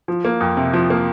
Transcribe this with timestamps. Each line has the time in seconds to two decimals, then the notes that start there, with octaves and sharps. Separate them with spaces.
0.08 F3
0.25 A#3
0.40 F2
0.57 C3
0.73 F3
0.90 A#3